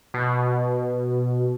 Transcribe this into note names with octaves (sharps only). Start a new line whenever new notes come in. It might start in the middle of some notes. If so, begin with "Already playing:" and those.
B2